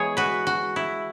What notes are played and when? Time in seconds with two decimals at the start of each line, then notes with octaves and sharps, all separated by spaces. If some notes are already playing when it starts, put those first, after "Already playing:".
Already playing: E3 G#3 B3 G#4 C#5
0.17 F#4 B4
0.47 F#4
0.76 E4